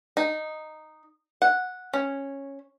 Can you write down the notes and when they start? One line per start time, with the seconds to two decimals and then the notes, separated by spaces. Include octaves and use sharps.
0.17 D#4
1.42 F#5
1.94 C#4